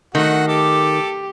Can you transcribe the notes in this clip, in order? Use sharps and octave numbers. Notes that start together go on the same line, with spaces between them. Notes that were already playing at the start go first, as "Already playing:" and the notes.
D#3 A3 F#4 F#5
G4 A4 D6